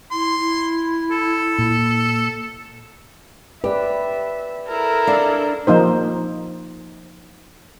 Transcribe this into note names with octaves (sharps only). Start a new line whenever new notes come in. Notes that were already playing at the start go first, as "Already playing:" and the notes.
E4 C6
E4
A4
A#2
G4 B4 D5 E5
E4 A4 A#4
D4 F5
F3 A#3 D#4 C5